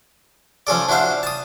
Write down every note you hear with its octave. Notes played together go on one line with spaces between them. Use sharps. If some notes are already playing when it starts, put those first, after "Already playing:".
F3 C#4 A4 D5
D4 E4 F#4 C5 F5
A5 D#6